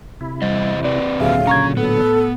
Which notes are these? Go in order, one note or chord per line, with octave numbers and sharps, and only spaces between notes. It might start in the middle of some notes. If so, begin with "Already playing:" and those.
C3 E4
E2 G3 C5 D#5
C4 G4 B4 D5
D#2 A#2 D3 F#3 G#4 E5 F5
C#3 C#4 A#5 C#6 G#6
A2 B3 A4